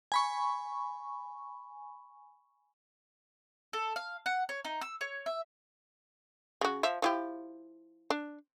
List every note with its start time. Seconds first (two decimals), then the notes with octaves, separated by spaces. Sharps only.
0.12 G#5 B5 C#6
3.73 A4
3.96 F5
4.26 F#5
4.49 C#5
4.65 D#4
4.81 E6
5.01 C#5
5.26 E5
6.61 C#3 F#4
6.83 F3 E5
7.02 F3 E4 G4
8.10 D4